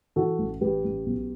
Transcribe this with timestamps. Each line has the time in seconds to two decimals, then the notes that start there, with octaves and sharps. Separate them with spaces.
0.16 E3 F#4 A4
0.39 A1
0.61 A1 G4 B4
0.84 A1
1.06 B1